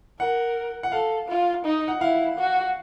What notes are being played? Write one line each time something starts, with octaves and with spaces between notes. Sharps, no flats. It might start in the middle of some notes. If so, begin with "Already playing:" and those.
A#4 F#5
F#5
A4 F5
F4
D#4
F#5
E4 F5
F#4